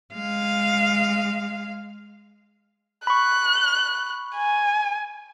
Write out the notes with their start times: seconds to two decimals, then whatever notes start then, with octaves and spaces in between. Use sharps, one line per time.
0.14 G#3 F5
3.07 B5 C#6 F#6
4.36 G#5